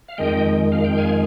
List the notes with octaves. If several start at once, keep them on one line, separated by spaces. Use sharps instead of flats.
F5
F2 D#3 G#3 D#5 G5
F5
G5
F5 G#5